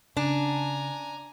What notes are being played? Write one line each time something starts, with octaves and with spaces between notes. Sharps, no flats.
C#3 D4 G#5 A#5